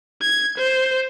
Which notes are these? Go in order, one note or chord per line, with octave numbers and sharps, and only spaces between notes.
G#6
C5